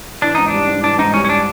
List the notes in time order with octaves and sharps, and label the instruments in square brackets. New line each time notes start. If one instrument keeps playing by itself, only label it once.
[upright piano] E3 [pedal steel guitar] D4
[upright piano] G#2 [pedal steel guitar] D#4
[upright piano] G3 [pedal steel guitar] D4
[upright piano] G#2
[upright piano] E3 [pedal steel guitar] D4
[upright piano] G#2 [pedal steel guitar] D#4
[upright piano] G3 [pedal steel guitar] C#4
[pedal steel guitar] C#4
D4